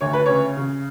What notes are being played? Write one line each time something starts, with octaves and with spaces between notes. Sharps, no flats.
D2 C#5
B4
C#3 C#5
C#3